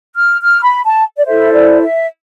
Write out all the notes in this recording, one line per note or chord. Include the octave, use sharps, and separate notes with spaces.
F6
F6
B5
A5
D5
E4 A4 C5 E5
D5
E5